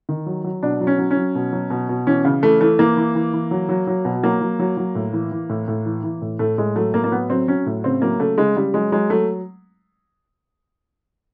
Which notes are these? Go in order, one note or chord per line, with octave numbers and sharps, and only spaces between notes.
D#3
F#3
F#3
B2 D4
F#3
C#4
F#3
C#4
F#3
B2
F#3
B2
B2
E3 C#4
C#3
E3 A3
E3 A3
E3 A#3
E3
E3
E3
F#3
F#3
F#3
B2
F#3 A#3
F#3
F#3
F#3
A2
E3
E3
A2
A2
E3
E3
A2
A2 A3
A2 G#3
F#3 A3
A2 A#3
A#3
F#3 B3
F#3 C4
F#3 C#4
A2
C#3 C4
F#3 A#3
C#3 A3
C#3 G#3
C#3 G3
F#3 G#3
F#3 G#3
F#3 A3